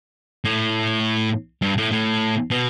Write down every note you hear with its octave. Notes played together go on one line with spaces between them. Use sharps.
A2
G2
A2
A2
B2